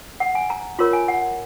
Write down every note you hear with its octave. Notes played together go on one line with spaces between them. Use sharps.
F#5
G#5
A#5
F4 A#4 C#5 C6
G#5
F#5